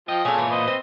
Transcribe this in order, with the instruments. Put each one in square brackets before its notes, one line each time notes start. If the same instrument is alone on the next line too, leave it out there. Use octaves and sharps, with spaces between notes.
[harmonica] F3 G5 [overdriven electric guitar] D#5
[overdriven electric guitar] A#2 [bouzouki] G#4 A4 [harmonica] C#5 G#5
[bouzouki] E3
[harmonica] B4 C5 D#5
[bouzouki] C4